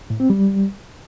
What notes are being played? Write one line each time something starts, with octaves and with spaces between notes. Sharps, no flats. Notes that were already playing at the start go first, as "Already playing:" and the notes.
A2
C4
G3